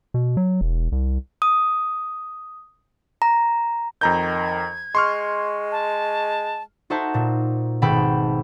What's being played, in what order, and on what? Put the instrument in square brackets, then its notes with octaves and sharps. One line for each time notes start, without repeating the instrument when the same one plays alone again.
[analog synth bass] B2
F#3
E1
C2
[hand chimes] D#6
A#5
[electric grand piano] F2 A#5 G6 [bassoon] D#3 [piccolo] G#6
[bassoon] G#3 [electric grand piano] C6 C#6 F6
[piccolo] A5
[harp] D#4 F#4 A4 C5 E5 A5
A#2
G#1 B2 A3 A4 G5 B5